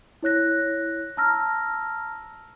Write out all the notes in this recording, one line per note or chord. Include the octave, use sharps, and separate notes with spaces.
E4 C#5 F#6 A#6
A5 A#5 E6 F6 A#6